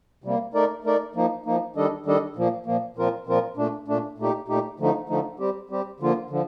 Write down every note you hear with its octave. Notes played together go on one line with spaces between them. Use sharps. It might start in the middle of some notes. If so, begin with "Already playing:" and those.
C3 G3 A#3
A3 D#4 A#4 D5
A3 D#4 A#4 D5
F3 A#3 D#4
F3 A#3 D#4
D#3 G3 D4 A4 D#5
D#3 G3 D4 A4 D#5
A#2 F3 A#3
A#2 F3 A#3
A#2 F3 C4 F4 A#4
A#2 F3 C4 F4 A#4
A#2 A3 D4
A#2 A3 D4
A#2 A3 D#4 G4
A#2 A3 D#4 G4
D3 F3 A3 D#4
D3 F3 A3 D#4
G3 C4 G4
G3 C4 G4
D3 F3 A#3 F4
D3 F3